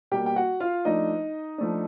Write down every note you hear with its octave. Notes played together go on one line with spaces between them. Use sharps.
B2 G3 A#3 G4 G5
G5
F#4 F#5
F4 F5
F3 A3 D4 D#4 D#5
F3 A3 D4